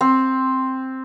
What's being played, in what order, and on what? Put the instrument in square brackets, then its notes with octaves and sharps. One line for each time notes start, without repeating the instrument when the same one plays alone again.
[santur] C4